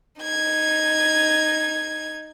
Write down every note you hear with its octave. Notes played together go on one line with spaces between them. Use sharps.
D#4 G#6